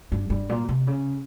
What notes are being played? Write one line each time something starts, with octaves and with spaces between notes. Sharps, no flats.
G2
G2
A#2
C3
C#3